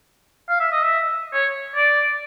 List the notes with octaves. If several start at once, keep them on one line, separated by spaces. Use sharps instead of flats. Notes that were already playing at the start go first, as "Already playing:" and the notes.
F5
E5
D#5
E5
C#5
D5